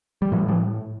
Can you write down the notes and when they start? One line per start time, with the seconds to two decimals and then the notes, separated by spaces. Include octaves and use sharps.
0.22 G3
0.32 A2 E3 F#3
0.48 F3 G3